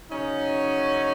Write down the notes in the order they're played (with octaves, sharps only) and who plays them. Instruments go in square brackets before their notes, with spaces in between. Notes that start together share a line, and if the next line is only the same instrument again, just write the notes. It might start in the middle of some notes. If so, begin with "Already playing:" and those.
[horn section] C#3 F#3 C#4 [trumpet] D#4